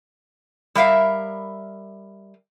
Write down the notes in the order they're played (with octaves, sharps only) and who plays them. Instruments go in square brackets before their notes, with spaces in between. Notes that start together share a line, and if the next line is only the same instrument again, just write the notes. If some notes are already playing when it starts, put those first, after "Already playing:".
[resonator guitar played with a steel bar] G3 A#4 E5 F5